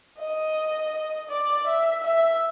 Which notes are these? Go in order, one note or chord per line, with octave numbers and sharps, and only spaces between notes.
D#5
D5
E5
E5